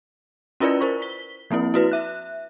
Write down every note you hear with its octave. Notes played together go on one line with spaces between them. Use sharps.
C#4 E4 F4 A#4 B4 D5
A#4 C5 C#6
B6 G7
F3 A#3 C4 E4
E4 F#4 B4
E5 F#6